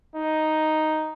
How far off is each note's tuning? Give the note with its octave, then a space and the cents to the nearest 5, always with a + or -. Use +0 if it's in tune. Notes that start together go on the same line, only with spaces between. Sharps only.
D#4 +0